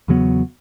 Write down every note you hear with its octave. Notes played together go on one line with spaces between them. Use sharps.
E2 C#3 F#3 B3